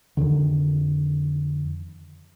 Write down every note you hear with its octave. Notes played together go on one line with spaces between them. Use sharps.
F2 B2 D3 D#3